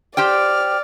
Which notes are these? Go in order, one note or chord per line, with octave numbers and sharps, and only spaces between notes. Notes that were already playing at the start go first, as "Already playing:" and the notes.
G4 C5 D5 G5 F6